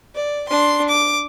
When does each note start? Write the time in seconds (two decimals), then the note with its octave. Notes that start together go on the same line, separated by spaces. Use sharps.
0.15 D5
0.49 D4 C6
0.89 D6